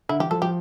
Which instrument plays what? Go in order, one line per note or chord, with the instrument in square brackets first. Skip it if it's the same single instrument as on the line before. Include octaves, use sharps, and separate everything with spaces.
[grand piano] D3 [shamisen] E4
[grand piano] E3 [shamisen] G4
[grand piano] F3 [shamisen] A4
[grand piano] F3 [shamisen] G4